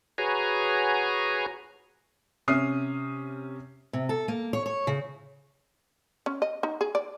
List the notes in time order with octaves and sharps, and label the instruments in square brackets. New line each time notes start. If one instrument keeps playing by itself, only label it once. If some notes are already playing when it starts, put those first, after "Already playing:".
[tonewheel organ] F#4 G#4 B4 C#5 G#5 A#5
[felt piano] C3 C#4 E5 D#6 F6 C7
[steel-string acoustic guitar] C3
A4
A#3
C#5
C#5
C#3
[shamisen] C#4
D#5
D#4
G#4
D5